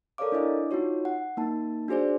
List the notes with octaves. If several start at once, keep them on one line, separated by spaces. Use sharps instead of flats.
A4 A#4 C#5 D5 F5 D6
D4 E4 D#5 D6
D#4 F4 F#4 C#5
F#5
A#3 D#4 A5
D4 F#4 G#4 C5 D5